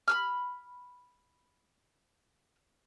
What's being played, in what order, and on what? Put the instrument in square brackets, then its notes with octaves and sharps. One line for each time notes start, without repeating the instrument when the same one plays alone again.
[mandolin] B5 E6 F6